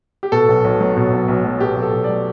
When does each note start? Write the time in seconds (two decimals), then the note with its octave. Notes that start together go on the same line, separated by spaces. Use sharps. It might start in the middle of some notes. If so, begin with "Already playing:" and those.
0.23 G4
0.32 B2 A4
0.49 B1
0.64 B1
0.80 F#3
0.97 B2
1.13 B1
1.28 B1
1.44 F#3
1.60 B2 G4
1.77 B1
1.82 A4
1.93 B1
2.04 D5
2.09 F#3